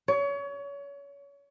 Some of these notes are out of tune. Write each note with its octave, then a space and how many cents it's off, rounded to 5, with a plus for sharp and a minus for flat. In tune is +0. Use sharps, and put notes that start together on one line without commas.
C#5 +30